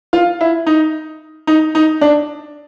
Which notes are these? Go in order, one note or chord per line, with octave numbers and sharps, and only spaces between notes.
F4
E4
D#4
D#4
D#4
D4